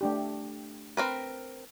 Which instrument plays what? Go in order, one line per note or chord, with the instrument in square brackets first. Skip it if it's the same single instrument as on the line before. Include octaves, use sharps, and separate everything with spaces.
[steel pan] A3 D4 G4
[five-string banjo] C4 A#4 B4